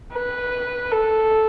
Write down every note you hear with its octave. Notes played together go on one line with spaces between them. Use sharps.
B4
A4